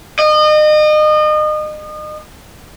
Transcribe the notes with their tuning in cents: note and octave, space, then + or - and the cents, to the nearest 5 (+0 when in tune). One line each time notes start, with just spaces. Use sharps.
D#5 -35